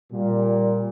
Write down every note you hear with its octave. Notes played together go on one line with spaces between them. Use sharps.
A#2 G3